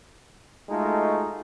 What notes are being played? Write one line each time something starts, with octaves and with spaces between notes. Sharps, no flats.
G#3 A3 D#4 F4 F#4 A4